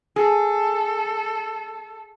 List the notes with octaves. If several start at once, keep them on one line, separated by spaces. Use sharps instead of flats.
G#4 A4